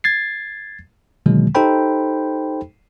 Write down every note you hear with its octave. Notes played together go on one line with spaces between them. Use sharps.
G#6 A6 C7
B2 D3 D#3 F#3 G#3 A#3
D#4 G4 A4 C5 G5 B5